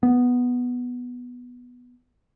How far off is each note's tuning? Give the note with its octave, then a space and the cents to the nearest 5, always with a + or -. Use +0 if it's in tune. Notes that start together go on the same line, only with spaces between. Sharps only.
B3 -5